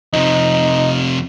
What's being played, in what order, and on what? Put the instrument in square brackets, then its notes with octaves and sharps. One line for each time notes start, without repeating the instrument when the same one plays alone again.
[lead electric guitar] F2 C3 [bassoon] D#4